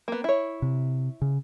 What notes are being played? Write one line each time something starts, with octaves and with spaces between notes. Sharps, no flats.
A#3 B3
E4 C#5
C3
C#3